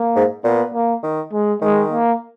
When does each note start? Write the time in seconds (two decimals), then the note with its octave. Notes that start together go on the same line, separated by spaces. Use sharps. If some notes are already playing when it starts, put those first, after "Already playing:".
Already playing: A#3
0.16 G#2
0.45 A#2 B3
0.74 A#3
1.03 D#3
1.33 G#3
1.62 D#3 G#3
1.92 A#3